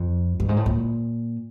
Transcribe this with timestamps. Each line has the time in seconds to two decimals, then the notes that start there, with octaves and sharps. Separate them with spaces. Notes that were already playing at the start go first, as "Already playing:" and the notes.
Already playing: F2
0.40 G2
0.49 G#2
0.57 A2
0.66 A#2